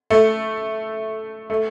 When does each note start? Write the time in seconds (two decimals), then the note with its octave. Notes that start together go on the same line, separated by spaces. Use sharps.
0.10 A3
1.50 A3